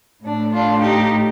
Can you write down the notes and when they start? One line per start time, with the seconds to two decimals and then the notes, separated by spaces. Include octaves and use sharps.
0.24 A2 A3 D4
0.52 D4 F4
0.81 D#4 G4